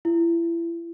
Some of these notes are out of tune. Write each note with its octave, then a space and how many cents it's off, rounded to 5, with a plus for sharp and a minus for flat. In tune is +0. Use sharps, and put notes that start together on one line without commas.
E4 +30